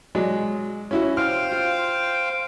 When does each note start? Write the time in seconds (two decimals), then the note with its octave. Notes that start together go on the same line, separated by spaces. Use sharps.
0.15 F#3 G#3 D5
0.91 C#4 E4 F#4
1.17 C5 F5 G5 F6
1.52 F4